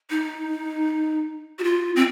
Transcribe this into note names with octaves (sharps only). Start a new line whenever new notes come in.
D#4
F#4
F4
C4